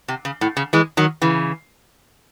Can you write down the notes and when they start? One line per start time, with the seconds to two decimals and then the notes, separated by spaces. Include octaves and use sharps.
0.08 C3
0.25 C#3
0.41 A2
0.57 C#3
0.73 E3 G#3
0.97 D#3 F#3
1.22 C#3 E3